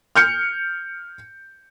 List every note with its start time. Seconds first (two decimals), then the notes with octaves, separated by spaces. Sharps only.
0.16 F6 G6 C#7